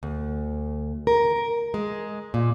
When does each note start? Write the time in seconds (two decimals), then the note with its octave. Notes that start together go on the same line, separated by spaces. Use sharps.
0.03 D2
1.07 A#4
1.74 G#3
2.34 A#2